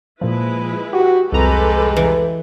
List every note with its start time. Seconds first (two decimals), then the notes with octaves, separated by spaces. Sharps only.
0.21 A#2 F3 G#3 E4 B4
0.93 F#4 G4
1.32 C2 F2 G#3 G4 A4 B4 A#5
1.97 E3